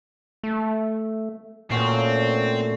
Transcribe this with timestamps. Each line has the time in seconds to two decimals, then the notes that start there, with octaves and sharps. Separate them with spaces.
0.43 A3
1.70 A#2 A3 C4 C#4 F#4